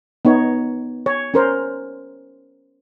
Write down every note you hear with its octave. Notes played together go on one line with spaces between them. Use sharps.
B3 D#4 C#5
C#5
C#4 A#4 C5